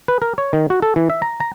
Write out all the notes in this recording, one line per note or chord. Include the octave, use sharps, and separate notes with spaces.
B4
A#4
C#5
D#3
F#4
A4
E3
E5
A#5
A#5